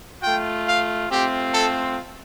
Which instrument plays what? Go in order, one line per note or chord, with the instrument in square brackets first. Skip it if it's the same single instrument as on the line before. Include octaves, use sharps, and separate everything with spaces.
[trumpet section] A3 F4 G5
F5
A3 C4 F4 G4
A4